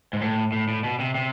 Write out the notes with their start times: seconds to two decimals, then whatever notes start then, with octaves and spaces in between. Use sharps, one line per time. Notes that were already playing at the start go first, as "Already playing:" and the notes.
0.13 G#2
0.21 A2
0.52 A2
0.68 A2
0.84 B2
0.99 C3
1.15 C3